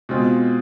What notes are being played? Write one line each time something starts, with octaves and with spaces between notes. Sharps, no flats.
B2 G#3 C4 F4